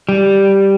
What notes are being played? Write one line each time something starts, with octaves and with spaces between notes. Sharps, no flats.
G3